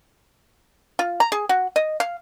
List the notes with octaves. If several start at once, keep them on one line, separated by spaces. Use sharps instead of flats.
F4
A#5
G#4
F#4
D#5
F5